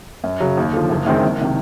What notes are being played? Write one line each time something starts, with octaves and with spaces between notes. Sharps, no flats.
F#2
C#3 F#3
D#2
D3 F3
F#1
F#2 D#3 G#3 C4
F#1
C3 D#3